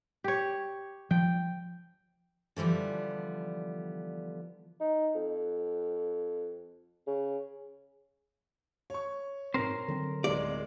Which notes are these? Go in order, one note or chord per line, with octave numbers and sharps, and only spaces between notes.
G4 C#5
F3 G5
D3 E3 F3 G3 B3
D#4
F2
C#3
C#5 C#6
G#2 B2 C4 A#4 C5
D3 F#3 C4
D1 G#3 D5